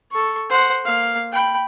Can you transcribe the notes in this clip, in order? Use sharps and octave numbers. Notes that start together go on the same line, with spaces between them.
A4 C#6
C5 F#5
A#3 F5
G5 B5